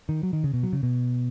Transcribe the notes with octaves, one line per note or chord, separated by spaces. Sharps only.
D#3
F#3
D#3
C#3
B2
F#3
C#3
B2